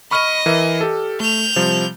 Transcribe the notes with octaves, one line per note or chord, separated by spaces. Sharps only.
D#5 B5 C#6 F6
E3 A#4 E5
G4 A4
A3 G6 F7
C3 F3 G3